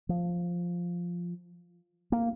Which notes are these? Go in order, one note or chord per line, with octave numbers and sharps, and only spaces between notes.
F3
A#3